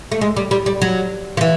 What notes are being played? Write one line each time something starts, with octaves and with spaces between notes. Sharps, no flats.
A3
G#3
G3
G3
G3
F#3
F3
E3